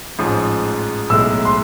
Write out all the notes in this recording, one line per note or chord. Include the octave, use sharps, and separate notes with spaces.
A1 G#2 F3
B1 A2 G#3 E6
C6